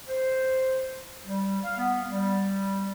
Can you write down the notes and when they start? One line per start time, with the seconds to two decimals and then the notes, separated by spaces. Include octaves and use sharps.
0.08 C5
1.26 G3
1.64 F5
1.78 B3
2.11 G3